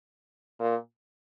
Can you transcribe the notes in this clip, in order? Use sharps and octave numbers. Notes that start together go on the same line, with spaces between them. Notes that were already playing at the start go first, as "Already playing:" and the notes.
A#2